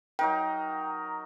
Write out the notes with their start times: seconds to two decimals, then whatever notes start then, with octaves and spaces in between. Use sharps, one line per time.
0.19 F#3 D#4 A#4 G5